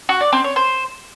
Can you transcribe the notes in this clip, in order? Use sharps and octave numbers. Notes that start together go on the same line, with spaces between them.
F#4
D5
C4
C#5
C5